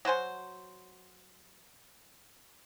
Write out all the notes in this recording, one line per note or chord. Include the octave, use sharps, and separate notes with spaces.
F#3 F#4 C5 G#5